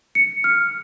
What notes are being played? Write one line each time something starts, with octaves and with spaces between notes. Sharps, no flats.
C#7
F6